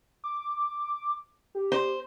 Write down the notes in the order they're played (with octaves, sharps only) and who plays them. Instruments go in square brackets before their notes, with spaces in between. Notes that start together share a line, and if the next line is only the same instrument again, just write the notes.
[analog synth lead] D6
G4
[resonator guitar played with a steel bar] C5